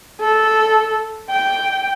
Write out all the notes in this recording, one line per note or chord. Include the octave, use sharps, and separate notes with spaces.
A4
G5